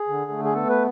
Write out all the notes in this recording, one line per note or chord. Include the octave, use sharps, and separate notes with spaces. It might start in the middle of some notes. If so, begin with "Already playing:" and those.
Already playing: G#4
D3
A3
G#4
B3 A4
B4